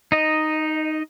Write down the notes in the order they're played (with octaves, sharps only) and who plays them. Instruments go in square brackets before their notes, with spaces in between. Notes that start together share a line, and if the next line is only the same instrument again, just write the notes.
[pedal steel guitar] D#4 D#5